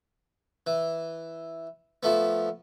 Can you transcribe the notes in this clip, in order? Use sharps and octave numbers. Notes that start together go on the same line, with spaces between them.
E3
F3 A3 B3